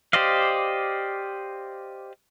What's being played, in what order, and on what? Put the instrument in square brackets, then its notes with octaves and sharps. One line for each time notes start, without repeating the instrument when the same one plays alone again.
[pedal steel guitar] G4 C5 D5 D#5 F5